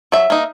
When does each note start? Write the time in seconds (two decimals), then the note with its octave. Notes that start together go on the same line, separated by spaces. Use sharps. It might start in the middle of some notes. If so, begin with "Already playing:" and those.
0.12 F#3 E5
0.30 A#3 D#4